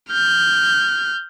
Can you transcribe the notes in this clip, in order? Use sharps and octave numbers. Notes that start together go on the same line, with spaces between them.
F6 G6